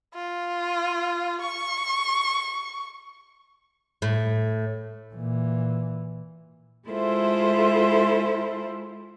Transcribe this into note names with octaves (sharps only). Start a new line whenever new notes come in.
F4
C#6
A2
A#2 E3
G#3 E4 F4 A4 C5 E5